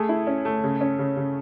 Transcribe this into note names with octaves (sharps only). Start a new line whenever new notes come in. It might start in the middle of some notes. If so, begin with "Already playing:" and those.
Already playing: A3 G#4
E4
C#4
A3
C#3
C#4
C#3
C#3